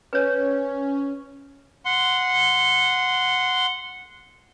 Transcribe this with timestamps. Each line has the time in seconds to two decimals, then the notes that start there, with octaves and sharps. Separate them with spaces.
0.13 C#4 B4 C#5
1.85 F#5 C6